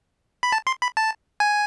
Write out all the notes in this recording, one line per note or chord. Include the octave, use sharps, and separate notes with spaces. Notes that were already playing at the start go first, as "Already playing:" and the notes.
B5
A5
C6
B5
A5
G#5